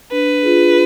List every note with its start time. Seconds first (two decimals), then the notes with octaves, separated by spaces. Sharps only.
0.12 D4 B4
0.43 F4 G#4